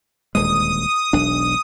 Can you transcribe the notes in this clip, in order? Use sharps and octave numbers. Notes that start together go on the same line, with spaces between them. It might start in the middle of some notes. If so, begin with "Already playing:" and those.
D#1 D2 G#3 D#6
E1 B1 D4